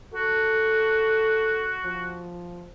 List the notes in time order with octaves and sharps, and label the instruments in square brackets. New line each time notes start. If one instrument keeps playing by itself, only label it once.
[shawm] F#4 [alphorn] A4
[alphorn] F3